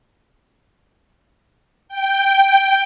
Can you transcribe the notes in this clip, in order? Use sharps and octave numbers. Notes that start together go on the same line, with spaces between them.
G5